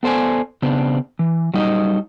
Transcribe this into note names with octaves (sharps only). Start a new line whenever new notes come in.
B3 A4 C5 D5 G#5
C#3 B3 C4 D4
E3
F#3 G3 D#4 D#5